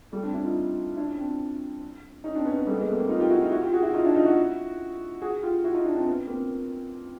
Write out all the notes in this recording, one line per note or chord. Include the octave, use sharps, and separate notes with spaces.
G3 A3
C4 D4
D4 E4
D#4 F4
D4 E4
C#4
C4 D4
C#4 D#4
C4 D4
B3 C#4
B3 C#4
G3 A3
B3
G#3 A#3
A3 B3
A#3 C4
D#4 F4
F4 G4
E4 F#4
D#4 F4
E4 F#4
F4 G4
F#4 G#4
E4 F#4
D#4 F4
D4 E4
D#4 F4
E4 F#4
F#4 G#4
F4 G4
E4 F#4
D#4 F4
D4 E4
C4 D4
B3 C#4
A#3 C4